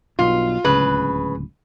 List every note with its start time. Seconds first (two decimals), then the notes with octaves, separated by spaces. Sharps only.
0.19 B1 G2 B2 F4
0.64 D1 C#2 C#3 B4